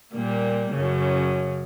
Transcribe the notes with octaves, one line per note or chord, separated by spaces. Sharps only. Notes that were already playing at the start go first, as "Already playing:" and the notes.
A#2 G3 A#3
F#2 C#3